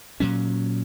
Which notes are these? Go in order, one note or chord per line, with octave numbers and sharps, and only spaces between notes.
A#2 F#3 C#4